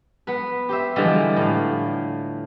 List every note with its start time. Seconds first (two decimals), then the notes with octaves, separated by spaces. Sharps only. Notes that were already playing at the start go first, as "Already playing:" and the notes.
0.27 B3 B4
0.69 G4 C5 E5
0.96 D3 E3 F3 G3 G#3
1.36 A2 F5